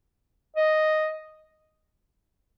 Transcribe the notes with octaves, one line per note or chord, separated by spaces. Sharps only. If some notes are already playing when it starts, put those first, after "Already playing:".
D#5